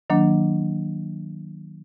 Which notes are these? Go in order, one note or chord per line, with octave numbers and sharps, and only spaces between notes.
D#3 F#3 A#3 D4